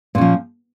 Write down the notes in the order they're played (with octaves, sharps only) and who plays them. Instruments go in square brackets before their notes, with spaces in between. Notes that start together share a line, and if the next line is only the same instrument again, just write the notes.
[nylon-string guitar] A#2
C#4
F3